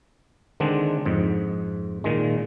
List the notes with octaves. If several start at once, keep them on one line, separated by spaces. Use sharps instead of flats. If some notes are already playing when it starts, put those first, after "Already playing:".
D3 D#3 G#3 C4 D4
F2 G#2
A#2 D#3 G#3